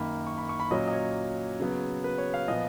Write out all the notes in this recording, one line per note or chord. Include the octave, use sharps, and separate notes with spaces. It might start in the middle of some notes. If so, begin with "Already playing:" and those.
Already playing: F#2 D#3 A#3 B5
C#6
B5
C#6
B5
A#2 F#3 A#3 C#4 D#5
D#5
C#5
C#3 F#3 B3
B4
C#5
F5
A#2 F3 B3 D#5